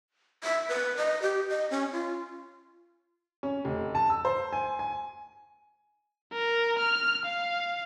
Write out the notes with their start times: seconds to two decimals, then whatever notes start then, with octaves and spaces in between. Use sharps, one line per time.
0.44 E5
0.69 B4
0.97 D#5
1.22 G4
1.49 D#5
1.71 C#4
1.93 F4
3.43 C#4
3.65 F1
3.95 A5
4.10 E6
4.25 C5
4.53 G#5
4.79 G#5
6.33 A#4
6.78 F6
7.25 F5